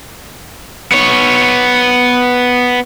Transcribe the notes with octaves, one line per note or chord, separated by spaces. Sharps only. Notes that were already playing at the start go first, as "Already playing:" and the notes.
B3 C#5